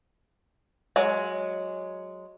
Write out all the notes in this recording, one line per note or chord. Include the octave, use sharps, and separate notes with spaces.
F#3 G#3